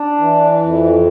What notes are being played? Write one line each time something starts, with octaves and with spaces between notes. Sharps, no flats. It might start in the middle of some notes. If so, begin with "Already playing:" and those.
Already playing: D4
E3
F2